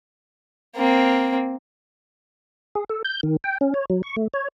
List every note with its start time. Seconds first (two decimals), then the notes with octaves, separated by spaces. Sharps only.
0.76 A#3 C4
2.75 G#4
2.89 A4
3.05 G6
3.23 D#3
3.44 G5
3.61 C#4
3.74 C#5
3.90 F#3
4.03 C#6
4.17 A3
4.34 C#5